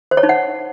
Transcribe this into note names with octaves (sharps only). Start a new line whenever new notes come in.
C5
C#5
D#4
F#5